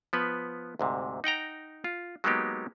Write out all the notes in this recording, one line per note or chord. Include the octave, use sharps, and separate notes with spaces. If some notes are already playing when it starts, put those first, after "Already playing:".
F3 B3 B4
D2 G#2 C3
D#4 F#5 G5 A#5
F4
F#3 G#3 A#3 B3 D#4 G4